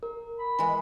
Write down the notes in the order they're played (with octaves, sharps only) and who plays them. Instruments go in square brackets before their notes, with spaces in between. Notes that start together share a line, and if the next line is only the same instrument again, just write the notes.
[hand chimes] A#4
[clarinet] B5
[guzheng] E3 G#3